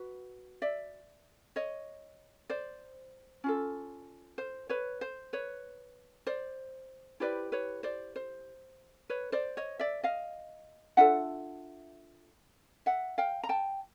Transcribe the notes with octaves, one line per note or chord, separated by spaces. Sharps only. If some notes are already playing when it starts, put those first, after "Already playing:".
Already playing: F#4 B4
D5 E5
C#5 D#5
C5 D5
C#4 F4 A4
C5
B4 C#5
C5
B4 C#5
C5 D5
E4 G4 B4 C5 D5
B4 C#5
C5 D5
C5
B4 C#5
C5 D5
C#5 D#5
D5 E5
D#5 F5
D4 F4 A4 E5 F#5
E5 F#5
F5 G5
A#5
G5 A5